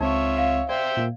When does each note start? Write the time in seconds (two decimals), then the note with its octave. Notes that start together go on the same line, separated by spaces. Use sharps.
0.01 C#2 C4 D#4 F4 C#5 E5 C#6
0.38 F5
0.69 C5 D5 E5 G5
0.97 A#2 A#3